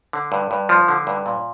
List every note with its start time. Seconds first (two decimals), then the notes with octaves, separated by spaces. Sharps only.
0.13 D3
0.32 G2
0.51 G2
0.69 F3
0.88 D3
1.07 G2
1.26 A#2